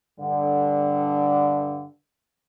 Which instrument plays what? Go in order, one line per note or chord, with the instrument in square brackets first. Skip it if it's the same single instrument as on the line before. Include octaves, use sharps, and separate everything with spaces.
[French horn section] G2 D3